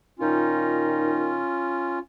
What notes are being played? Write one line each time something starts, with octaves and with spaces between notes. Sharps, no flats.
A#2 D#3 C#4 D#4 F4